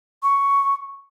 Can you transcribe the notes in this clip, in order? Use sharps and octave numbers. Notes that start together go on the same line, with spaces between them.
C#6